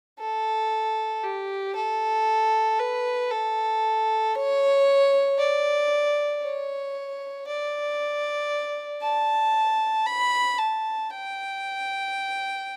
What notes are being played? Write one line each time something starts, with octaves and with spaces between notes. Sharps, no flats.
A4
G4
A4
B4
A4
C#5
D5
C#5
D5
A5
B5
A5
G5